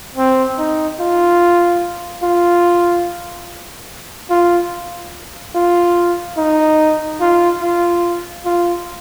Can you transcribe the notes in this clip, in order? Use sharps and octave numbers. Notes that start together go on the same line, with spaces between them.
C4
D#4
F4
F4
F4
F4
D#4
F4
F4
F4